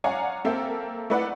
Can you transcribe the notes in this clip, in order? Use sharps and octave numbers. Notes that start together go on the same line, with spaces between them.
C#5 D5 F5 F#5 G#5 A#5
A#3 C4 A4 E5 G5
A3 E4 B4 D5 F#5